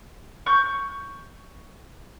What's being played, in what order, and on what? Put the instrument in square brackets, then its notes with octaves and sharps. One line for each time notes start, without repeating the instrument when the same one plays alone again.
[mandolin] C#6 G6